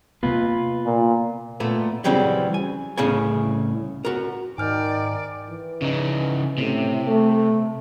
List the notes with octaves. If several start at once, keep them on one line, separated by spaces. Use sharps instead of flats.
C3 A#3 B3 F4 B4
A#2
A#2 A3 B3
C#3 E3 F#3 G3 C4 C#4
G#5
C2 A2 C#3 G#4 C#5 G#5
F#4 A#4
G#2 D#3 D5 G#5 F6 G6
E3
C#3 D#4
A2 C3
A3